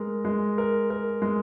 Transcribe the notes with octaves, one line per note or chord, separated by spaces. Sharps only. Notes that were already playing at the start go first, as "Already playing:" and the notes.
Already playing: G#3 A#4
G#3
A#4
A#4
G#3